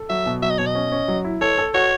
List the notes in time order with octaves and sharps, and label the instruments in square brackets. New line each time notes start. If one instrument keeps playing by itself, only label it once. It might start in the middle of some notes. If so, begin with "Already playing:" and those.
Already playing: [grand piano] A4
[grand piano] F#3 [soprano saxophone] E5
[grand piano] B2
[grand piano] F#3 [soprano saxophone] E5
[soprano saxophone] D#5
[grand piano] B2 [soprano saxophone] C#5
[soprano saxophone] D#5
[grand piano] C#4
C#4
F#3
E4
[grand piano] A4 [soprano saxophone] C#5
[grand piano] A4
[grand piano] F#4 [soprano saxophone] C#5